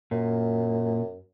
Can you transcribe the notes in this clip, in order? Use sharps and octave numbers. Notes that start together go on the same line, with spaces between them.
F#2 A#2